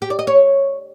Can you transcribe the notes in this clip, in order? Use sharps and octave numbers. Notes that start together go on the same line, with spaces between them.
G4
D5
D#5
C#5